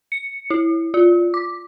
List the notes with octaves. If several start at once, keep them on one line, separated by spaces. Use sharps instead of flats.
C#7
E4
F4
D6